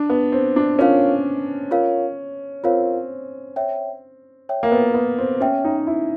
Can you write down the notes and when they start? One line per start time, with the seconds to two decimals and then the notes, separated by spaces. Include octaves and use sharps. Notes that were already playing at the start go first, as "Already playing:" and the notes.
Already playing: D4
0.10 B3
0.32 C4
0.56 D4
0.79 C#4 F4 A#4 C#5 F5
1.71 F4 A#4 C#5 F5
2.64 C4 F4 A#4 C#5 F5
3.56 C#5 E5 G5
4.49 C#5 E5 G5
4.63 A#3
4.72 B3
4.94 B3
5.18 C4
5.40 C#4 C#5 E5 G5
5.64 D#4
5.87 E4